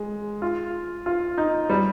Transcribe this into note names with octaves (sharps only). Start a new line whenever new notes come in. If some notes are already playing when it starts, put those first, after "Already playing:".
Already playing: G#3
F4
F4
D#4
G3